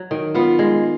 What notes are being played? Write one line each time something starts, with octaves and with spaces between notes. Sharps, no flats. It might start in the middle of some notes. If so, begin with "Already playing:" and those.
Already playing: F#3
D#3
B3 F4
G#3